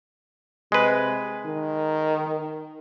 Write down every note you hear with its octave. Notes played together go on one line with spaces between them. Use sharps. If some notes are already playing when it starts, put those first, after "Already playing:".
C3 G#3 B4
D#3